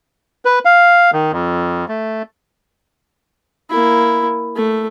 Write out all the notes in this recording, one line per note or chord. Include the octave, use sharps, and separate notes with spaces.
B4
F5
D#3
F2
A3
A#3 E4
A3